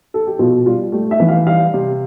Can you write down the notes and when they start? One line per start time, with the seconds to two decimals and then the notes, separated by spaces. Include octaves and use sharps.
0.14 A4
0.27 G4
0.39 B2 F4
0.66 G3 F4
0.92 A3 G4
1.11 E5
1.20 E3
1.29 F5
1.47 G3 F5
1.74 C3